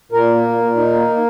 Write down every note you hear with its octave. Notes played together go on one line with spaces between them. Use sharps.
A#2 A#4
A#3
A#2
A#2
D#4
A#3
A#3